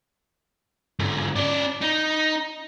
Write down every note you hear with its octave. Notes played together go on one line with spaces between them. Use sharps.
G#2 D3
C#4 D5
D#4